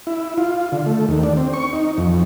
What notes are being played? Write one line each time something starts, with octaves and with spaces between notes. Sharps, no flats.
E4
F4
D3
A3
D#2
D4
C4
C#6
D#4
F2